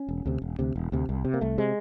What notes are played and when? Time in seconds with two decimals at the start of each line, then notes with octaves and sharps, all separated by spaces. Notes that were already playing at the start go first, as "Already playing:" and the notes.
Already playing: C#4
0.09 E1
0.26 D2 C3
0.42 E1
0.59 D2 C3
0.76 E1
0.92 D2 C3
1.09 C2
1.25 C3
1.34 A#3
1.41 C2 A3
1.58 C3 G#3